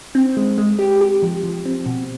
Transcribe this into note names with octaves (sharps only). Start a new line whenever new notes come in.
C4
G#3
G#3
G4
G4
F3
F3
C4
B2